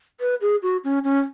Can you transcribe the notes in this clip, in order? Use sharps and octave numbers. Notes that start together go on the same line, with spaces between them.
B4
G#4
F#4
C#4
C#4